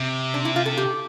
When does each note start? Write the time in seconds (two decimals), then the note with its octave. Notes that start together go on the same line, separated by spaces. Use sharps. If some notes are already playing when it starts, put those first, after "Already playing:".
Already playing: C3
0.34 D4
0.45 E4
0.56 F4
0.66 A4
0.77 G4